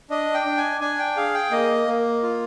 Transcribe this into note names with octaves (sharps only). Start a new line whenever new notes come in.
D4 D#5
G5
D4
G#5
D4 G#5
G5
G#4 F5
G5
A#3 D#5
A#3
F4